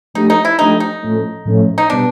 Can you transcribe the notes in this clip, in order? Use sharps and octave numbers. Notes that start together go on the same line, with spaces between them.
F3 A3 D4 D#4 G4
D#4
E4
F3 A3 D4 D#4 G4
D#4
A2 F3 A3 C#4
A2 F3 A3 C#4
D#4
B2 G3 B3 D4